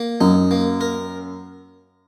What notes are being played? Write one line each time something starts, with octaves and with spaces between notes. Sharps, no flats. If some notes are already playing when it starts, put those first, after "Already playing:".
Already playing: A#3
F#2 D#4
A#3
A#4